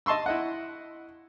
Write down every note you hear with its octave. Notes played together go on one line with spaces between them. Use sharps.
D#5 A5 C6 C#6 E6
E4 D#5 F#5